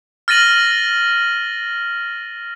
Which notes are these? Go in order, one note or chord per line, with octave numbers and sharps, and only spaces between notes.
F6 A6 A#6 D#7 F#7